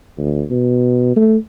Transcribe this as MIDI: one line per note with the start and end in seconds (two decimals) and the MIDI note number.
0.18 0.44 38
0.51 1.12 47
1.16 1.37 57